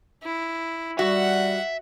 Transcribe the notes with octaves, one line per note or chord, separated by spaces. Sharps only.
E4
G3 F#4 E5 F#5